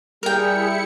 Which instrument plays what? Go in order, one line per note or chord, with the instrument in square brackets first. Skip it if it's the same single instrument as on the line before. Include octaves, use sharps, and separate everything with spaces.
[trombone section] G3 [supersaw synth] E4 C#7 [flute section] G#4 [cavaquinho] A#4 G5